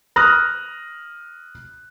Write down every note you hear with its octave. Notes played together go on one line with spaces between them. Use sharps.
D#6 F6 F#6 A#6